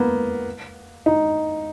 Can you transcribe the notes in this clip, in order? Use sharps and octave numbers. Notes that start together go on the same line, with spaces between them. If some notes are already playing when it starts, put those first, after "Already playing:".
Already playing: A#3 B3
D#4